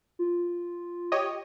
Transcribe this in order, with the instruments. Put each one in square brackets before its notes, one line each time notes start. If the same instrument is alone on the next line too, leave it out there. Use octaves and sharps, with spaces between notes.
[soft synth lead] F4
[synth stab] G4 C#5 D#5